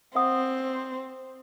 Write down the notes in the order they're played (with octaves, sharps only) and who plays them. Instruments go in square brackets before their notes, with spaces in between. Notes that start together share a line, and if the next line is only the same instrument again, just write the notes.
[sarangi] C4 [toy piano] E5 F#5 D#6